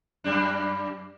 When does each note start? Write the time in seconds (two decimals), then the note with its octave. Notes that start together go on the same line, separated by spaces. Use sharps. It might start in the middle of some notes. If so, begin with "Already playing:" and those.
0.24 F#2 G3 D4